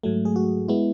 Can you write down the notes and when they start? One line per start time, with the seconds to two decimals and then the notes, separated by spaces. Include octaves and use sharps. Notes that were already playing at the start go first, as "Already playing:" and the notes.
0.03 G#2 F#3 A3
0.25 G#4
0.36 F#4
0.68 G#3 B3 E4